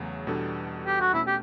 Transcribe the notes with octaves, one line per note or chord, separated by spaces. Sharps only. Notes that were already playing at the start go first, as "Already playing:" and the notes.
Already playing: E2 C#3 F#3 A3
E2 B2 G3 D4 A4
G4
F#4
B2 A3 C#4 E4
G4